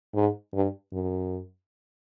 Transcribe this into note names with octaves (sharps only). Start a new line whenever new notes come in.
G#2
G2
F#2